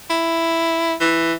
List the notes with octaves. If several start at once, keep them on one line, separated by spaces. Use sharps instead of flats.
E4
E3